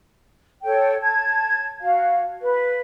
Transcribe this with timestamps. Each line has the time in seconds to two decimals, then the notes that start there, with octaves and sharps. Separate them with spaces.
0.64 A4 C#5 G5
1.02 A5 G#6
1.81 F#4 F5
2.42 B4